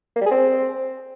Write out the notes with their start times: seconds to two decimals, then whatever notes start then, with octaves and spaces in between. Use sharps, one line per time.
0.16 A#3
0.21 G3
0.26 G#4
0.31 C4